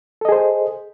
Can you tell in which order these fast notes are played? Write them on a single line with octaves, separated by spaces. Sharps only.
A4 D#5 G#4 C5